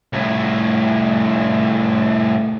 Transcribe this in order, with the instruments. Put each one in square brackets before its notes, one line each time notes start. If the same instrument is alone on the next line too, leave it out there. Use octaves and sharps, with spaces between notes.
[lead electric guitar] C2 A2